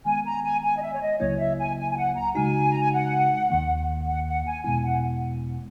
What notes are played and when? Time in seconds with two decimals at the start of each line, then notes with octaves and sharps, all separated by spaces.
0.05 D#3 G#3 B3 G#5
0.25 A#5
0.44 G#5
0.63 G#5
0.77 D#5
0.82 E5
0.94 C#5
1.01 D#5
1.20 C#2 C#3 F#3 A#3 E4 C#5
1.39 E5
1.59 G#5
1.77 G#5
1.91 G#5
1.97 F#5
2.15 A#5
2.35 C#3 G#3 D#4 F#4 G#5
2.69 A#5
2.81 G#5
2.92 F#5
3.50 D#2 D#3 A#3
4.07 F#5
4.27 F#5
4.45 G#5
4.64 E2 B2 G#3 B3 E4 G#5
4.84 F#5